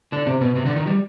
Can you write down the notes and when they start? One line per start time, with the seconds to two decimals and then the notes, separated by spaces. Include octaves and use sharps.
0.12 D3 D4
0.27 C3 C4
0.41 B2 B3
0.55 C3 C4
0.65 D3 D4
0.76 D#3 D#4
0.87 G3 G4